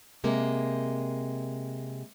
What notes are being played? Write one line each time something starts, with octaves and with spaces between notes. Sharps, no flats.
C3 G#3 A#3